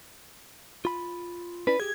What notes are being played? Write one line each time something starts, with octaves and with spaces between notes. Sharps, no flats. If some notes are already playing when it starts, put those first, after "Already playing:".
F4 B5
C#4 E4 B4 D5
G4 G#4 G#6